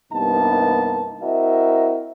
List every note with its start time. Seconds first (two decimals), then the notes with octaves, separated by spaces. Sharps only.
0.12 C2 G2 A#3 B3 D#4 A5
1.22 C4 E4 F#4 A#4 D#5 E5